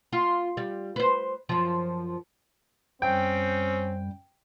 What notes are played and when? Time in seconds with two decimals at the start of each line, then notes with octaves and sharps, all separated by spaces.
0.13 F4
0.57 G3
0.96 B4 C5
1.49 F#2 F3
3.02 F#2 G3 C4 C#4 G5